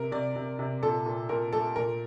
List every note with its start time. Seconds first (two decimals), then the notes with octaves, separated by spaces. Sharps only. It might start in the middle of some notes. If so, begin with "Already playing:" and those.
Already playing: C3 A#4
0.12 C3 D5
0.36 C3
0.59 C3
0.83 A#2 A4
1.06 A#2
1.29 A#2 A#4
1.53 A3 A4
1.76 A#2 A#4